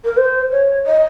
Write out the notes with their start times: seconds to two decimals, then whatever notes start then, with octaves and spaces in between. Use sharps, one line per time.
0.05 A#4
0.17 C5
0.51 C#5
0.86 D#5